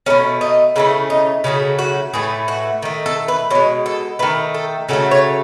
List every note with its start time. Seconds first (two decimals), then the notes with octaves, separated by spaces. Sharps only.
0.06 B2 F#3 A3 C#4
0.41 D#4
0.76 C#3 E3 A3 E4
1.10 D#4
1.44 C#3 F#3 A3 G#4
1.79 F#4
2.13 A2 E3 A3 G#4
2.48 F#4
2.82 D#3 A3
3.06 A4
3.28 B4
3.50 B2 G#3 C#5
3.86 A4
4.19 D#3 A3 B4
4.54 A4
4.89 C#3 F#3 A3 A4
5.11 C#5